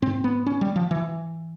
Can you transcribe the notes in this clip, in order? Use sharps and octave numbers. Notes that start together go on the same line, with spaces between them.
G#2 C4
B3
C#4
G3
F3
E3